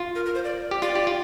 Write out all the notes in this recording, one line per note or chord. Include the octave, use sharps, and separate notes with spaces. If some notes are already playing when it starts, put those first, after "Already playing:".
Already playing: F4
A#4
A#4
C5
D5
G4
F4 D5
G4
F4